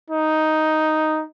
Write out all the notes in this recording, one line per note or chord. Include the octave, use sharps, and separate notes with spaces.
D#4